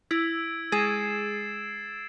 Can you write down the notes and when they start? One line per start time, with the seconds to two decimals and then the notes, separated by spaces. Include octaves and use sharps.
0.11 E4 E6 G#6 D7
0.72 G#3 G#4 A6 C7 E7